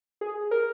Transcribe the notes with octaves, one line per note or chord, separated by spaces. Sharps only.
G#4
A#4